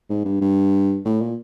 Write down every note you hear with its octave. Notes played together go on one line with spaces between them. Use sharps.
G#2
G2
G2
A2
A#2